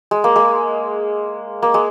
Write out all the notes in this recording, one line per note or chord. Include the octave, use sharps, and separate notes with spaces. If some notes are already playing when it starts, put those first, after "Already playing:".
G#3
A#3
G#3
A#3
G#3